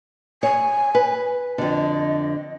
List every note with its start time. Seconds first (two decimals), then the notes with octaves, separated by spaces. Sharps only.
0.43 C#5 G#5
0.95 B4
1.58 F2 D3 D#5